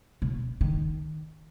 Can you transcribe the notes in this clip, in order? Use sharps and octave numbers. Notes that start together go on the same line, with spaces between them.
B2
D#3